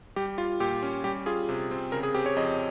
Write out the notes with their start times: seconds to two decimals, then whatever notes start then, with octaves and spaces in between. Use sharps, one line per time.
0.16 G3 G4
0.38 F4
0.60 A#2 G4
0.83 C#4
1.04 G3 G4
1.26 F4 G#4
1.49 C3
1.71 C4
1.92 C#3 A#4
2.03 G#4
2.15 C4 G4
2.26 C#5
2.36 F2 D#5